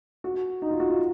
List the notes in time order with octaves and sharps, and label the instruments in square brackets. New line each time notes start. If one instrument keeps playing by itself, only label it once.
[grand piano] F#4
D#4
F4
F#4
F4